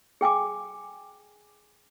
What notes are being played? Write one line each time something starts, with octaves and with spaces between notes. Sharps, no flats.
G#4 G5 G#5 D6